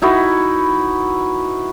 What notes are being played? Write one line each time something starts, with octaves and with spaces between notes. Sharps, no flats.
D#4 E4 F#4 B4